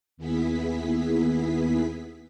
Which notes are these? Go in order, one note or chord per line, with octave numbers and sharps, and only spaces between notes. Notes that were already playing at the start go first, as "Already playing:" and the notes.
D#2 B3 E4 G#4 B6